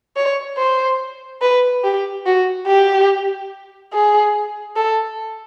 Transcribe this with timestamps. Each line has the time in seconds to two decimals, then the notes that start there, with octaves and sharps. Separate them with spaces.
0.16 C#5
0.57 C5
1.41 B4
1.84 G4
2.26 F#4
2.67 G4
3.93 G#4
4.76 A4